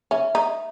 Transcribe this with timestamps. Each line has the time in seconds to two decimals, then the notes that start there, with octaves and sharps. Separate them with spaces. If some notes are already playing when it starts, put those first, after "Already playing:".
0.11 C#4 E5
0.35 D#4